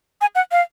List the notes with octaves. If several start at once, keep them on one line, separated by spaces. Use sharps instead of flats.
G#5
F#5
F5